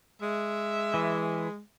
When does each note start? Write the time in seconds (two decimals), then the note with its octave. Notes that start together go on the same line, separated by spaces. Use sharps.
0.22 G#3 E5
0.94 E3